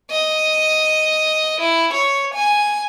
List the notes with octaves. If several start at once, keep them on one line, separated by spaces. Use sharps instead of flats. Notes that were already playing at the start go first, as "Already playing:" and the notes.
D#5
E4
C#5
G#5